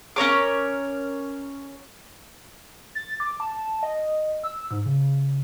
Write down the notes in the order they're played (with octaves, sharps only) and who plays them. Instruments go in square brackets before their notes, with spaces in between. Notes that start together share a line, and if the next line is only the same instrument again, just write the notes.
[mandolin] C#4 A#4 C#5 D6
[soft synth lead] A6
D6
A5
D#5
E6
G#2
C#3